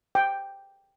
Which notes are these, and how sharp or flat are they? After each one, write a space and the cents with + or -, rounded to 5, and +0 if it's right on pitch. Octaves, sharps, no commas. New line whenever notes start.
G5 +5